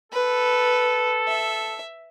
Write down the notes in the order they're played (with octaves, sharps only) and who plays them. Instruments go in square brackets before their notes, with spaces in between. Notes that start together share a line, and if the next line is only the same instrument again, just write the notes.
[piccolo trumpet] A4 [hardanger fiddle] B4
[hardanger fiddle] E5